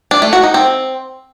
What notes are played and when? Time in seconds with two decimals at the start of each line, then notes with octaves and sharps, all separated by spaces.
0.11 D4
0.22 A3
0.33 F#4
0.43 D#4
0.54 C4